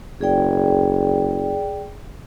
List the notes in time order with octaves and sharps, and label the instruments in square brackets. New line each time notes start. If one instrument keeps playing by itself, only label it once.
[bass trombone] F#1 [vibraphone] G#4 D5 G5